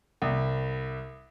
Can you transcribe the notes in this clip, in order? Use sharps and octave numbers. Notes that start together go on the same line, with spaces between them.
C2